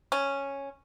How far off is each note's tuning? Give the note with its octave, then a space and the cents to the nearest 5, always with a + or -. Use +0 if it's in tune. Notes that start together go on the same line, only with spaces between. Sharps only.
C#4 -5